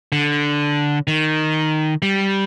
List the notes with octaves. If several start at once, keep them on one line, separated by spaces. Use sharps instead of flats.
D3
D#3
G3